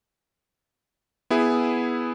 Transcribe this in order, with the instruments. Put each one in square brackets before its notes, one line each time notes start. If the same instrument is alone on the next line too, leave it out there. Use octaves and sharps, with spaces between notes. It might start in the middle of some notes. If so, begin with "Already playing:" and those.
[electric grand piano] B3 E4 G#4